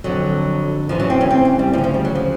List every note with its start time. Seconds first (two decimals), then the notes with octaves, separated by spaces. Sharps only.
0.04 F2 D3 F#3
0.89 E2 C#3 E3 F3
1.00 F#3
1.10 C4
1.21 C#4
1.30 C4
1.45 C4
1.59 G3
1.73 D2 C#3 E3 F3
1.84 F3
1.94 G3
2.05 F#3
2.15 F3